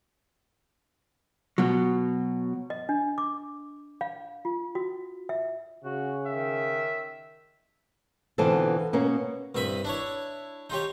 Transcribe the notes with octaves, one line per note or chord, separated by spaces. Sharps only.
B2 F#3
D#5
D4
D6
F5
F4
F#4
E5
C#3 F#4
D#3 E5
B2 D3 E3 C4 F4 A4
B2 A#3 C#4
C2 G2 E5 B5 D#6
D4 E4 C#5
D#4 F4 G4 C#5